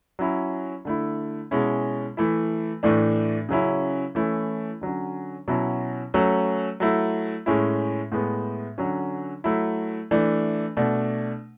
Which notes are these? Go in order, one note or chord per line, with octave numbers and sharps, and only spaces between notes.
F#3 C#4 E4
D3 A3 E4
B2 G#3 C#4 E4
E3 A3 E4
A2 E3 A3 D4
C#3 F#3 C#4 E4
E3 A3 C#4 E4
D3 F#3 C#4
B2 F#3 C#4 E4
F#3 A3 C#4
F#3 A3 E4
A2 G#3 C#4 E4
A2 G#3 B3
D3 F#3 C#4
F#3 A3 E4
E3 A3 D4
B2 A3 D4